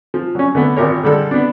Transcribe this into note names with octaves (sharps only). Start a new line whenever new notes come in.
F3
F#3 C#4
D3 A3 B3
G#1 A#2 G4 A#4 C#5
D3 G3 G#3 A4
B3 D4